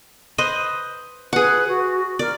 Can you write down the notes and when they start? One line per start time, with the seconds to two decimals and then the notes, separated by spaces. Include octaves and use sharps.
0.38 B4 C5 D#5
1.33 G#4 B4 F#5
1.68 F#4
2.19 A#4 D5